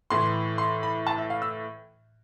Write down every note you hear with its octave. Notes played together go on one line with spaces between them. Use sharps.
A2 E3 C6
C6
B5
A5
E5
F5
E6